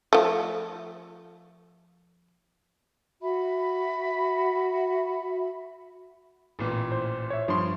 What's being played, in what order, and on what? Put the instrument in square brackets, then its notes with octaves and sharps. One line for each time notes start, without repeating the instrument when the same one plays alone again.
[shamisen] F3 A3
[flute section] F#4 E5 B5
[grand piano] A1 A#2 E3
[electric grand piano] C5
C#5 E5
[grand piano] G2 [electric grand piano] F3 C6 C#6